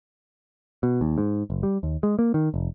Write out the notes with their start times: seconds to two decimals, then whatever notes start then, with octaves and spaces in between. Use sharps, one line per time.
0.83 B2
1.01 D#2
1.18 G#2
1.50 F#1
1.63 G3
1.83 D#2
2.03 G#3
2.19 A#3
2.34 D#3
2.54 F1